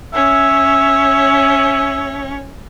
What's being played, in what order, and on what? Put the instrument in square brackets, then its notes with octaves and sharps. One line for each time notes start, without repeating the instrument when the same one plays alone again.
[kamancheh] C#4 C#5 [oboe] E5